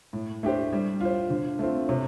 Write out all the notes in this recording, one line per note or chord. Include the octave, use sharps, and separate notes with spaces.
A2
A3 D4 G4 C5
G3
F4 C5
D3
A3 C4 F4
C3